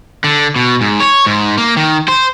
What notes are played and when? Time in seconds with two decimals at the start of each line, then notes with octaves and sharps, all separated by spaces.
0.24 D3
0.56 B2
0.81 G#2
1.00 C#5
1.26 G#2
1.58 A#3
1.77 D#3
2.08 C5